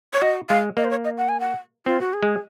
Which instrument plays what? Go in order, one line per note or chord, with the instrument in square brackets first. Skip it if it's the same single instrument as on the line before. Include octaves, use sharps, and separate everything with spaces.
[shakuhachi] C#5
[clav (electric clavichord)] F#4 [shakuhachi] D#5
[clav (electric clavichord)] G#3 [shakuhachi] F5
[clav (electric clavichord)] A#3 [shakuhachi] D#5
[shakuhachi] C5
C#5
D#5
F#5
G#5
F#5
[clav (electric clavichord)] C4 [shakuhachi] F4
[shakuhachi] F#4
G#4
[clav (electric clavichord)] G#3